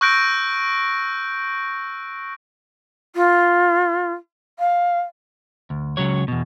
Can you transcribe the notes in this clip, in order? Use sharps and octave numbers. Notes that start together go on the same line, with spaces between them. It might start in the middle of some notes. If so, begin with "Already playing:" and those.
C#6 E6 F#6 G6 A#6 D7
F4
F5
D2
C#2 C#3 F#3 C#5
E2 B2